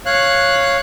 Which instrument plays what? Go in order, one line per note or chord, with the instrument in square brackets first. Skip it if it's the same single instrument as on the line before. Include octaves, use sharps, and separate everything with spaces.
[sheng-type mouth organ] C#5 F5 F#6